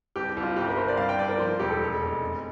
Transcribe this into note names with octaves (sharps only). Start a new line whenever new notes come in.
C2 G4
G4
C2
F4
G1 G4
A#4
G1 C5
D5
C2 F5
G5
C2 D5
A#4
F3 C5
E1 G4
A4
F1
F1
F1